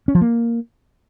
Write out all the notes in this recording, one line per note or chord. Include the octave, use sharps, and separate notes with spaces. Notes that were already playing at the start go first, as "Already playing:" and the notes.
C#4
F3
A#3